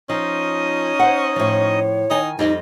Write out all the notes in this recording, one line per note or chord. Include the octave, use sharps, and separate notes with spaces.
F3 C#4 D#4 D#5 D#6
C5 F#5
A2 F3 C#5
D#3 D#4 G#5
F2 G3 D#4 D#5